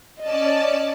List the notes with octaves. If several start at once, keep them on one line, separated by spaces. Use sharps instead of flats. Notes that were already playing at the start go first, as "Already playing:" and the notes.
C#4 D5 D#5 A5